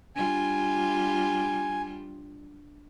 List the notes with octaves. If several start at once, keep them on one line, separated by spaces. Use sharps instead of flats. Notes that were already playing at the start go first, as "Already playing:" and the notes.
G3 D4 F4 G#5